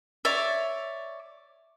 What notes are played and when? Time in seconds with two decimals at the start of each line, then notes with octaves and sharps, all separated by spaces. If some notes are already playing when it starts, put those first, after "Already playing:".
0.25 C#5 D5 E5